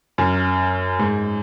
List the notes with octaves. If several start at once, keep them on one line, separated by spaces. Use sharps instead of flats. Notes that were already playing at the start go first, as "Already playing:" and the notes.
F#2
G#2